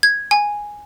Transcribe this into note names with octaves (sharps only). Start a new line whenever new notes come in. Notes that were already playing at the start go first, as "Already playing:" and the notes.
G#6
G#5